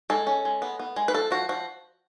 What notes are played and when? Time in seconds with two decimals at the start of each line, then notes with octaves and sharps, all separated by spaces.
0.10 G#3 A4
0.27 C#4
0.45 G#3
0.62 B3
0.79 B3
0.96 G#3
1.08 B4
1.14 F3 A4
1.31 F3 F#4
1.49 F3 F#4